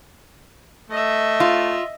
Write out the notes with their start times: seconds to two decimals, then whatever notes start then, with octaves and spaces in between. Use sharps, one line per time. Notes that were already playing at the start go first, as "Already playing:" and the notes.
0.90 A3 D#5 E5
1.40 F4